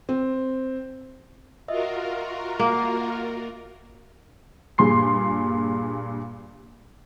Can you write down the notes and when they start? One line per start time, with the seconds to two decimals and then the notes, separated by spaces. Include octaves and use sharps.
0.09 C4
1.68 F4 F#4 A#4 D#5 E5
2.59 A#3
4.78 G2 A#2 G#4 C6 C7